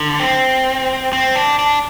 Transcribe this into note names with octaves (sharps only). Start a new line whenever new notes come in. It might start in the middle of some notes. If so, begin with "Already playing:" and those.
Already playing: D3
C4
C4
D4
D4